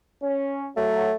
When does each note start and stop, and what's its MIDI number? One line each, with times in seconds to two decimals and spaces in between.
0.22 0.70 61
0.77 1.11 54
0.77 1.15 57